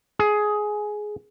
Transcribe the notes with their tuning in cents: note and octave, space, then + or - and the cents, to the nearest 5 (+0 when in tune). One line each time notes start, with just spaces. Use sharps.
G#4 +15